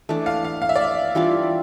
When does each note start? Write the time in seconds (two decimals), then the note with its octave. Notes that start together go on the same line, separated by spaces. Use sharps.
0.09 E3 A3 D4
0.26 F5
0.44 F5
0.62 F5
0.69 E5
0.76 D5
0.84 E5
1.15 E3 G3 D4 F4